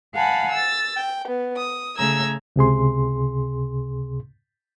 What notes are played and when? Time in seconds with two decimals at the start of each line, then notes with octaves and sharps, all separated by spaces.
0.14 F5 F#5 G#5 A5 B5
0.52 E6 A6
0.96 G5
1.27 B3
1.56 D#6
1.97 C#3 A3 A#5 E6 G#6
2.56 C#2 C3 G#4 C6